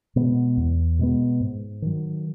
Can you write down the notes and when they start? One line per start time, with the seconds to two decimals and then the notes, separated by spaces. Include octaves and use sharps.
0.16 B2 G#3 B3
0.57 E2
0.99 B2 G#3 B3
1.41 G#2
1.82 D#3 F#3